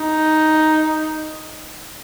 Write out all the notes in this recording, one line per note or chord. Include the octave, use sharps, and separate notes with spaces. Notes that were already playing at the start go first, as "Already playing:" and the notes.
Already playing: D#4